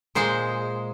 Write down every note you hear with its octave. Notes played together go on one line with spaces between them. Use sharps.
A#2 G#3 C5